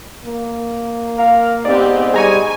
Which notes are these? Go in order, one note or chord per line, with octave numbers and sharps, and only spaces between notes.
A#3
F4 A#4 F5
G#2 B3 C4 G4 D5
G3 G#4 G#5 A#5 C#6